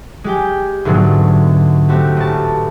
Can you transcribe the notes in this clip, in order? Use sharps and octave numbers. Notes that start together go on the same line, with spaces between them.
G#3 G4 G5
D2 G#2 B2 D3 F#3
A3 C4 F#4 G4
A1 A5